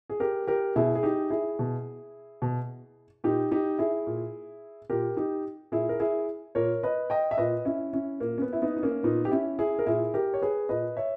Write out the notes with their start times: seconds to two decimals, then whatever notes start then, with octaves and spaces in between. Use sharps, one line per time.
0.10 G#4
0.20 G4 A#4
0.47 G4 A#4
0.76 B2 E4 G#4
0.95 G#4
1.03 D#4 G4
1.30 E4 G#4
1.59 B2
2.42 B2
3.24 A#2 D#4 G4
3.51 D#4 G4
3.79 E4 G#4
4.07 A#2
4.90 A#2 G4 A#4
5.17 D#4 G4
5.72 A#2 E4 G#4
5.89 A#4
6.00 E4 G#4
6.55 A#2 A#4 C#5
6.83 B4 D#5
7.10 D#5 G5
7.31 E5
7.37 A#2 B4 D#5
7.65 C#4 E4
7.93 C#4 E4
8.20 A#2 A#3
8.38 C#4
8.41 B3
8.53 E4
8.62 B3 D#4
8.77 D#4
8.83 A#3 C#4
9.03 A#2 B3 D#4
9.25 G4
9.31 C#4 E4
9.59 E4 G#4
9.79 A#4
9.86 A#2 E4 G#4
10.14 G4 A#4
10.34 C#5
10.42 G#4 B4
10.69 A#2 B4 D#5
10.97 C#5 E5